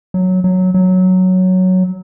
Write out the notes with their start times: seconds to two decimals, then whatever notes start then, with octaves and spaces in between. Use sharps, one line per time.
0.14 F#3
0.44 F#3
0.74 F#3